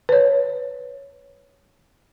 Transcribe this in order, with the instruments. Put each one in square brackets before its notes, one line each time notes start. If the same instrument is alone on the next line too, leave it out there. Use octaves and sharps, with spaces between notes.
[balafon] B4 C#5